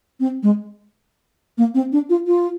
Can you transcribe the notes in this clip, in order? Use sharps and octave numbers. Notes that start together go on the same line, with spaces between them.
C4
G#3
A#3
C4
D4
F4
F4